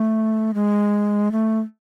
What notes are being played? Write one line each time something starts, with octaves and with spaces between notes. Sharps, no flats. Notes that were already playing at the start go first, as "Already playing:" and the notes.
Already playing: A3
G#3
A3